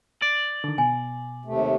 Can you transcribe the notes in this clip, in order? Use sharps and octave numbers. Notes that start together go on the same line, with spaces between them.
D5
D3 D#3
B2 G#5
D#2 C3 A3